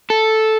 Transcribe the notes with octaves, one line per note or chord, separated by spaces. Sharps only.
A4